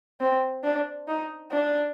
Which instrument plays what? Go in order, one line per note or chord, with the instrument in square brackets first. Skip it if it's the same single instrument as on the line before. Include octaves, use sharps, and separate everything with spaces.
[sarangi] C4
D4
D#4
D4